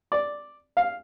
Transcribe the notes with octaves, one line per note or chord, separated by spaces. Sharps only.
D5
F5